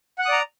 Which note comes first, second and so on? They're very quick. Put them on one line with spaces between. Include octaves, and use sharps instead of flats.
F#5 F#6 D#6 D5 A#5